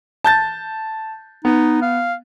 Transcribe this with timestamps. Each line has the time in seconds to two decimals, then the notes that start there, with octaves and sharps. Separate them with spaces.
0.24 A5 G6 A6
1.45 B3 D#4
1.82 F5